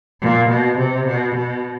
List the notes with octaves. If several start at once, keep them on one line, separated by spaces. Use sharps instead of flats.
A#2
B2
C3
B2
B2